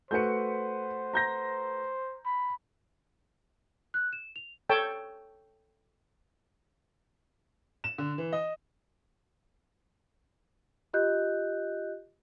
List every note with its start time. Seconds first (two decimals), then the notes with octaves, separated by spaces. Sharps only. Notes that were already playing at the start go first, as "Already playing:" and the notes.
0.11 A3 F#4 B4 C5 G6 C#7
1.13 A#5 G6 A#6
2.25 B5
3.94 F#6
4.13 E7
4.36 F7
4.69 A4 C#5 G5 A5
7.84 E7
7.98 D3
8.18 E3
8.33 D#5
10.93 F4 G4 D#5 F#6 G6